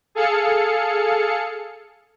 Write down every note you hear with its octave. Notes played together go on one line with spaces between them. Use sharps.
G#4 A4 F5 C#7